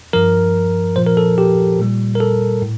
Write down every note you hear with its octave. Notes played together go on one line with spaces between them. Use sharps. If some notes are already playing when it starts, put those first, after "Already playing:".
G2 F3 A#4
A#2 F3 C5
A#4
A4
G4
A#2 G3
A#4
A4
A2